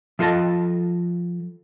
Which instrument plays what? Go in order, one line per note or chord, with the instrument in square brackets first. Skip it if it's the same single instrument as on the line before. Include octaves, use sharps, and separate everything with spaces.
[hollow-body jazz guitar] F3 F4 A4 D#5 A5